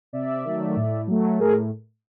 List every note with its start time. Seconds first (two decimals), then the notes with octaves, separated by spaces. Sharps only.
0.13 C3 D5 E5
0.44 D#3 F#3 A3
0.76 A2
1.07 F#3 A3
1.39 A2 G#4 A#4